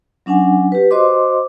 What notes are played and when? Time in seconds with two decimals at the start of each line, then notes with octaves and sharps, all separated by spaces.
0.26 F#3 C#4 D4 F#5 G#5
0.72 G4 B4
0.91 F#4 C5 D#5 C6 D6